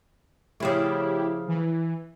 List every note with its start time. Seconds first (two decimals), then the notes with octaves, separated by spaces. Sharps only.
0.60 C#3 F3 A3 E4 G4
1.48 E3